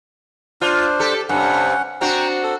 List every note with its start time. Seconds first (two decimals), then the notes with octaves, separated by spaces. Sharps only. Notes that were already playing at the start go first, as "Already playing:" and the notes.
0.61 D4 F4 C5
0.99 G4 A4
1.29 G2 C3 C#4 F#5
2.01 C4 D4 F#4 G5 A#5
2.43 A4